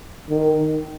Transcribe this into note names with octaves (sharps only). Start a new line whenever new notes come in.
D#3